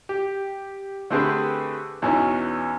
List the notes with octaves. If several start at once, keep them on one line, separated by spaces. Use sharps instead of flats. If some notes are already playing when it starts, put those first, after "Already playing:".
G4
D3 A3 C4 G4 G#4 B4
E2 B2 E3 C#4 D#4